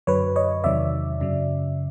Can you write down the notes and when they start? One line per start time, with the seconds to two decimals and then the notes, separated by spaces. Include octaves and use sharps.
0.07 F#2 D3 F#3 B4 C#5
0.36 C#5 D#5
0.64 E2 C3 D#3 F#3 D5 E5
1.20 F#2 C#3 F#3